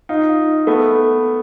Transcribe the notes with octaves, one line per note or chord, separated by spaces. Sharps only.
D#4 F4
A3 B3